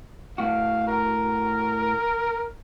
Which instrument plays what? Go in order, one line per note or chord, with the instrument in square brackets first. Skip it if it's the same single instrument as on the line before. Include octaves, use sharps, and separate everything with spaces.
[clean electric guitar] A2 F#4 [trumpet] F5
[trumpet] A#4